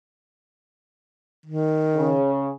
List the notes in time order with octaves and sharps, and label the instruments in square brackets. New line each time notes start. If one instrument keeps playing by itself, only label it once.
[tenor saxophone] D#3
[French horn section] C#3